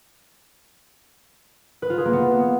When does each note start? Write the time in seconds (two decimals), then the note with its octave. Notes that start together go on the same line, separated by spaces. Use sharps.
1.82 B4
1.90 F4
1.98 G#4
2.05 A#3
2.13 B3